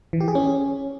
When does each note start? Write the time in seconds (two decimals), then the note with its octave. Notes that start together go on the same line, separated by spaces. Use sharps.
0.13 E3
0.21 G4
0.28 G#4
0.35 C#4